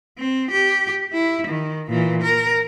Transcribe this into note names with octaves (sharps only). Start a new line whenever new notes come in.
C4
G4
E4
D#3
A#2 E3
A#4